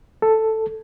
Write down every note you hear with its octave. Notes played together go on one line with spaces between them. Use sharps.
A4